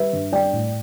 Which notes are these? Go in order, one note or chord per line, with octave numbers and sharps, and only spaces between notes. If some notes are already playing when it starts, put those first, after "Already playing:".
Already playing: G3 B4 E5
G2
G3 D5 G5
A2